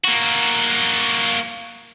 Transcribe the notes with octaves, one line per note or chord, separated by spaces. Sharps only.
A#3 F#4